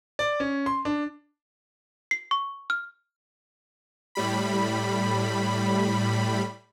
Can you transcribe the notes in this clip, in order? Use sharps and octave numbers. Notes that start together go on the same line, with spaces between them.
D5
C#4
C6
D4
C7
C#6
F6
A2 G3 B5